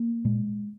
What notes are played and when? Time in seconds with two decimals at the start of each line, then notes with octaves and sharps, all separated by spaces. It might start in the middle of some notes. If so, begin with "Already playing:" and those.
Already playing: A#3
0.25 A#2 G#3